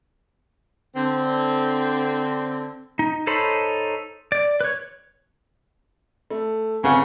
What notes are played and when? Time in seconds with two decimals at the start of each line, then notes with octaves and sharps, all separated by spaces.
0.96 D3 C4
2.99 D#4
3.27 D#4 A4 C5 C#5 B5
4.32 D5
4.61 B4 C#5
6.30 A3
6.84 G1 C#3 C4 F#5